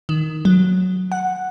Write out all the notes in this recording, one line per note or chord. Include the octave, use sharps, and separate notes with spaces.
D#3
F#3
F#5